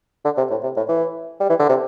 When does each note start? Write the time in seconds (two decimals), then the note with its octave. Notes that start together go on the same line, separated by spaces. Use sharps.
0.25 D3
0.37 C3
0.51 A2
0.63 C3
0.77 A2
0.89 E3
1.40 G3
1.49 E3
1.59 D3
1.69 C3